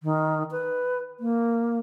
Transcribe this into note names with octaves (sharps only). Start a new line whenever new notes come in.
D#3
B4
A#3